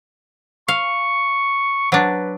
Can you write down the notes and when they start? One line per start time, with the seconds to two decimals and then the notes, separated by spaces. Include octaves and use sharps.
0.68 F5 C#6
1.92 F#3 D4 B4